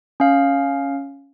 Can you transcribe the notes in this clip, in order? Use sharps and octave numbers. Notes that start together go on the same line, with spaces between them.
C#4 F5